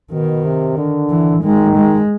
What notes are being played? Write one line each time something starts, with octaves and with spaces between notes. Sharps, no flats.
B2 D#3
C3
D3
E3
D#3 G#3
G#3